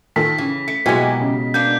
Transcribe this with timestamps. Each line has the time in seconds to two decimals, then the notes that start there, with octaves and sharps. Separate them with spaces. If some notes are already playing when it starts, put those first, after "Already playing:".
0.16 D#3 F4 A4 B6
0.38 C#3 E3
0.68 A3 C#7
0.86 B2 F#3 G#3 A#3 E4 G4 F#5 G#5
1.20 C#3
1.54 A#3 B3 D4 G6